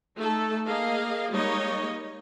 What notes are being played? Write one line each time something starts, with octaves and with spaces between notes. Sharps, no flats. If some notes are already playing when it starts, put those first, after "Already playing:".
A3 D#4 A4
A#3 G#4 D#5 F5
G3 G#3 A#3 D#4 C#5 D#5